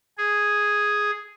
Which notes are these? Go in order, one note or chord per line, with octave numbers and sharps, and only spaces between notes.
G#4